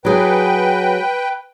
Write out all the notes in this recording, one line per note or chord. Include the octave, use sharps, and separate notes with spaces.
F#3 G#4 B4 G5